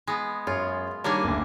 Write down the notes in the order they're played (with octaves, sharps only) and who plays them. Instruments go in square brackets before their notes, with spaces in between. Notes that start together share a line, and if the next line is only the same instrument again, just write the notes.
[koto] G#3 B3
[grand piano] F#2 G#4 C#5 [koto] F4
[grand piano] D#3 G3 C#5 [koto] A#3 D4 G#5
[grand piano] F#1 D2